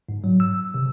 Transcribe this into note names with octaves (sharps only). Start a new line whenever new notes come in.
G#2
F#3
E6
C3